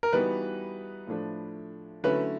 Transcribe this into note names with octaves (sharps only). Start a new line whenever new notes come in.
A#4
E3 G3 B3 D#4 F#4 B4
A2 F3 A3 D4
D3 F#3 A3 C#4 E4 B4